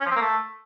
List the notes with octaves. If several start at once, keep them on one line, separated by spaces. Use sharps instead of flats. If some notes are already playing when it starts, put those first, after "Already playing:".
C#4
F3
C4
A#3
A3